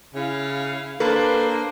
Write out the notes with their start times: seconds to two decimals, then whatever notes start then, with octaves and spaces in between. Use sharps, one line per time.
0.15 C#3 E4 F5
1.00 A#3 D4 A4 B4 C5